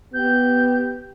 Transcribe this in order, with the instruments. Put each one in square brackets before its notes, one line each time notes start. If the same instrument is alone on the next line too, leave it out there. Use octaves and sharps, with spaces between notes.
[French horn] B3 [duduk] G4 [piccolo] G6